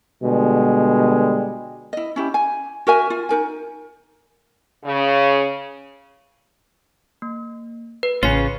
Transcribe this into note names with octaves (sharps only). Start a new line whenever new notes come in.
B2 D3 G3 G#3
E4 D#5
C#4 E4 G4
G#5
F#4 A#4 E5 G#5
F4
D#4 A#4 G#5
C#3
A#3
B4
A1 C#3 C#4 F4 C#5 C7